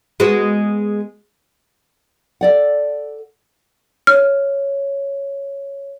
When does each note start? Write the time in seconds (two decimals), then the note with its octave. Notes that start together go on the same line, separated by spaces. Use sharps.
0.20 G#3 B3 F#4
2.41 A4 D5 F#5
4.07 C#5 F6